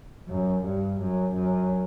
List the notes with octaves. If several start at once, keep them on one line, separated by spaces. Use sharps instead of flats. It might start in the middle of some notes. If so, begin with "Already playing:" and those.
F#2
G2
F#2
F#2